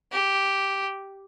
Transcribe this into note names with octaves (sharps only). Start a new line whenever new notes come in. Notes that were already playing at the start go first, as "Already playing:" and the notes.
G4